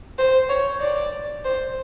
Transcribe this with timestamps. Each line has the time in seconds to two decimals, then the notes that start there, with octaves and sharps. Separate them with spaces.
0.19 C5
0.50 C#5
0.81 D5
1.44 C5